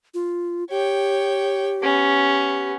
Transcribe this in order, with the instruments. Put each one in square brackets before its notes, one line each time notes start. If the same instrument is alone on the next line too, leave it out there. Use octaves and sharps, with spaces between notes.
[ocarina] F4
[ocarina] G4 [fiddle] C#5 G5
[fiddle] B3 [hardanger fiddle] C#4